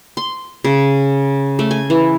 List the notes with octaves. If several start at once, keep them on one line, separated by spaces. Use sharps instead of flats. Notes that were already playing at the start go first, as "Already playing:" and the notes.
C6
C#3
A3
G#5
E3